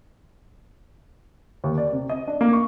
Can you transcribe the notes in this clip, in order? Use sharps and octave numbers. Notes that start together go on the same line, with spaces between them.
D#2
D5
C3
D#5
D4
A#3
C#6